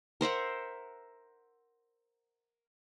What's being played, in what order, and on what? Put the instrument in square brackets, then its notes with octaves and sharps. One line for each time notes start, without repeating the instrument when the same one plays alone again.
[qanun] A#4 C5 E5 F#5